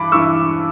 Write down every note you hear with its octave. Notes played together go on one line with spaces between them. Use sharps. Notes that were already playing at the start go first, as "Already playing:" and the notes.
Already playing: G2 E3 B5 D6
G2 E3 C#6 E6